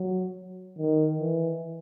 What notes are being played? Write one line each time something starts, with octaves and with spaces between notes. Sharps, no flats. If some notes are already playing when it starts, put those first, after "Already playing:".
Already playing: F#3
D#3
E3